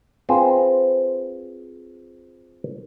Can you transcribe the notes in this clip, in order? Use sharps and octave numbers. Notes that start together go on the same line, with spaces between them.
C4 F4 G#4 B4 C5